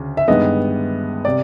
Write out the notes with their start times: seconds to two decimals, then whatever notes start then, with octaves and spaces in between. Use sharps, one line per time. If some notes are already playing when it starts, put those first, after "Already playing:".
Already playing: D2 C#3
0.17 E5
0.28 G2 D#3 G#3 B3 D#5
1.25 C3 D5